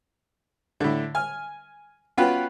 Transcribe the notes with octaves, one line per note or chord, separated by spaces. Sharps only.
A2 D3
G#5 F6
B3 C#4 F4 F#4 B4 G5